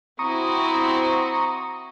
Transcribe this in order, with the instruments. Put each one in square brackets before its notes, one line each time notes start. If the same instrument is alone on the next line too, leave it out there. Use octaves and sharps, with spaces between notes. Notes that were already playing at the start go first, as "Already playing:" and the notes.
[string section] C4 E4 F#4 [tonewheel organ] A#5 C#6 D#6